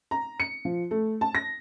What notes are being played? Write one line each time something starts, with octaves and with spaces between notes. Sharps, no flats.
A#5
C#7
F3
A3
A5
A#6